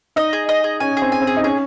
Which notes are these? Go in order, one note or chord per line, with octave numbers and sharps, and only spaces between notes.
D#4 D#5
G#4
D#5
G#4
C#4 G#5
G#4
C4
G#5
C4
G#4
D#4
C#4 G#4